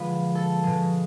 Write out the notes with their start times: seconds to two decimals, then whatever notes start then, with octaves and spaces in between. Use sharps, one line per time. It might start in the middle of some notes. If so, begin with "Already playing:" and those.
Already playing: D3 F3 G#3 B4
0.35 A4
0.64 B2 G#3